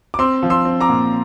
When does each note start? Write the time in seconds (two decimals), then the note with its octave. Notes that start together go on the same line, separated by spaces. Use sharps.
0.14 D6
0.19 C4 C6 E6
0.43 F3
0.50 C6 E6
0.65 C4
0.81 A#5 D6
0.89 A#2